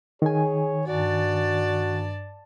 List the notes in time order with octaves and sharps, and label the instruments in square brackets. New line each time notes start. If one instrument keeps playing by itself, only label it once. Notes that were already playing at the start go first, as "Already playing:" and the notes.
[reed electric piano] D#3 G#5 [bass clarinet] G#4 [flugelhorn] C#5
[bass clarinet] G2 [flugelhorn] F#4 [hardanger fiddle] D5 A5